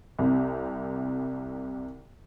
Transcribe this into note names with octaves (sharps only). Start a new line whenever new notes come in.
C2 C3